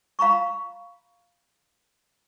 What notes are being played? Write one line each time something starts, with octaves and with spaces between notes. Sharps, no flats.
F5 A#5 B5 C#6